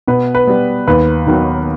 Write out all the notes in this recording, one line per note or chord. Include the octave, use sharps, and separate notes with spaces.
B2 B4
B4
G3 B3
D#2 B4
D#3 F#3 B3